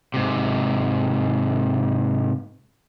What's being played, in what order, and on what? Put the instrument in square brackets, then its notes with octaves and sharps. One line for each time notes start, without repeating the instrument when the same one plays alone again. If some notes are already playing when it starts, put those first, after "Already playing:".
[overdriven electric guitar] G#2 C3